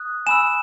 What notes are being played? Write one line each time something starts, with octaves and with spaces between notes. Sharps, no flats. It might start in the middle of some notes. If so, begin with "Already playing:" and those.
Already playing: D#6 F#6
G#5 B5 E6 E7